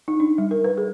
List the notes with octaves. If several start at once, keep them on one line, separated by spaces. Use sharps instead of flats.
D#4
D4
G3
A#4
B4
G#4